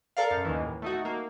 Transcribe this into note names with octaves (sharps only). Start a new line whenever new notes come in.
A4 A#4 D5 F5
F#2
D#2 D#3 E3
A2
A3 D#4 F#4
A#3